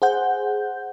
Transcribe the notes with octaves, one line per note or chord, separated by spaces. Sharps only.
G#4 C5 F#5 G6